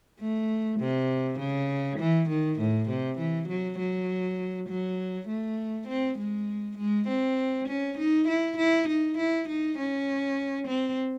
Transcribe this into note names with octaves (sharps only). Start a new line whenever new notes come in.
A3
C3
C#3
E3
D#3
A2
C3
E3
F#3
F#3
F#3
A3
C4
G#3
G#3
C4
C#4
D#4
E4
E4
D#4
E4
D#4
C#4
C4